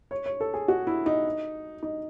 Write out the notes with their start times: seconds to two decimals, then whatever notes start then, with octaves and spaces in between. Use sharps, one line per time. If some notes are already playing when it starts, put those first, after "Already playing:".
0.11 C#5
0.26 C#5
0.40 A4
0.54 G#4
0.68 F#4
0.87 E4
1.06 D#4
1.83 D#4